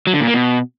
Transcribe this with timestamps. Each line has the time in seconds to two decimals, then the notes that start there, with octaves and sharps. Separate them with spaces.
0.07 F#3
0.14 D3
0.20 A#2
0.27 A#3
0.34 B2